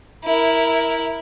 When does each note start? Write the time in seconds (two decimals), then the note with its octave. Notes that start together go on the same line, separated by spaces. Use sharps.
0.25 E4 A#4